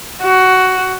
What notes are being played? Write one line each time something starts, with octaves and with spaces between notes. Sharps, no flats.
F#4